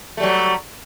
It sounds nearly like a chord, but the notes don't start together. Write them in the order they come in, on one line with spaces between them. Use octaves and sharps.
A3 G3 F#3